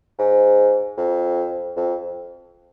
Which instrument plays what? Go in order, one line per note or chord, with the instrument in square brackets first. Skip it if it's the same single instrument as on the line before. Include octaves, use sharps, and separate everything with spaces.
[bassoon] G#2
F2
F2